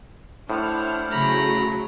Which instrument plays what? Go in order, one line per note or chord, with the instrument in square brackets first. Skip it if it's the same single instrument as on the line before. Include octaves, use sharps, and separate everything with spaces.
[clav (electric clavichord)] A2 [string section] D4 F6 [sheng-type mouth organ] E4 C5 F#5
[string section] C#3 F#3 A3 [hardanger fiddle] A#5 B5